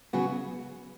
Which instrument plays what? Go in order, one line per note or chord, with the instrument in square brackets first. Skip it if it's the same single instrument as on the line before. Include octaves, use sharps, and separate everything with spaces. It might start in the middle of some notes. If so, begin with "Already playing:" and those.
[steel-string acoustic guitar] C#3 F#3 B3 F#4